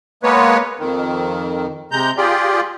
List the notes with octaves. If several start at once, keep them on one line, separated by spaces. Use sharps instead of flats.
G#3 A#3 B3 B4 C#5
F2 D#3
C3 G#3 A#5 G6
F4 G4 G#4 D5